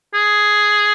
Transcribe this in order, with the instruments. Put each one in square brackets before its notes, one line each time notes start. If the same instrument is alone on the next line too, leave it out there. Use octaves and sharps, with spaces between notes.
[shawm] G#4